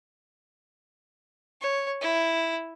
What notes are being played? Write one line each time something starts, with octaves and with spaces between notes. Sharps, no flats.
C#5
E4